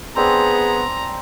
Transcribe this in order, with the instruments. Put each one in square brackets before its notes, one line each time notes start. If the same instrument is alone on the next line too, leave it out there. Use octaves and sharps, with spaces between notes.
[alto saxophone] B3 [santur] C4 D4 G#5 [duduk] G#4 [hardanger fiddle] A#5